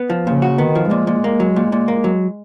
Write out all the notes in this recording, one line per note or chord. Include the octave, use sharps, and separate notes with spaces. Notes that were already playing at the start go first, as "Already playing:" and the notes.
Already playing: B3
F3
A#2 C#3
F#4
D#3 B3
F3
A#2 G#3
A#2
A#3
F#3
A#2
A#2
A#3
F#3